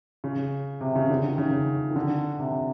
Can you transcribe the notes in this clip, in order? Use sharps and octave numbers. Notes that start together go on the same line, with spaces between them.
C#3
C3
C#3
D3
D#3
C#3
D#3
D3
C3